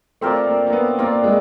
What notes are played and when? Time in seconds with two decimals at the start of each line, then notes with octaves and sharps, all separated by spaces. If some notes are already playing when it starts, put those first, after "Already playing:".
0.21 A3 C4 F4 A#4 D5
0.47 A#3
0.67 A#3
0.73 B3
0.99 A#3 C4 F4 A#4 D5
1.24 G#3